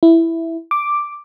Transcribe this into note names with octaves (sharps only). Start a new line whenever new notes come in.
E4
D6